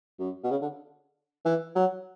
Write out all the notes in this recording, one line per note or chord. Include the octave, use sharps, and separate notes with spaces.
F#2
B2
C#3
D3
E3
F#3